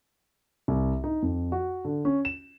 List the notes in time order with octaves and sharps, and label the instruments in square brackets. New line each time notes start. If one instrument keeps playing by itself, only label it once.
[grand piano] C2
D#4
F2
F#4
D3
C#4
E7